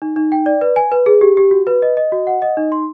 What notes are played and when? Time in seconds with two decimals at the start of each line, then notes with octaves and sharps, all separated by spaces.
0.02 D#4
0.16 D#4
0.32 G5
0.46 D5
0.61 B4
0.76 G#5
0.92 B4
1.06 G#4
1.21 G4
1.37 G4
1.51 F#4
1.67 B4
1.82 D#5
1.97 D#5
2.12 F#4
2.27 F#5
2.42 D#5
2.57 D#4
2.72 C6